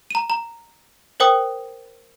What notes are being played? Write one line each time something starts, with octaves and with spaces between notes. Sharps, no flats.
A#5 D#7
A#5
A#4 C5 G5 D#6